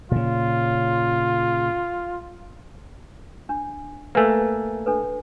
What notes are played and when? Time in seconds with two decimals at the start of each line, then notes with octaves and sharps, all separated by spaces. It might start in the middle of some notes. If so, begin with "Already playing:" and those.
0.12 A#2 C#3 F4
3.49 D4
4.15 A3 A#3 B4 G#5
4.86 D4 A4 B4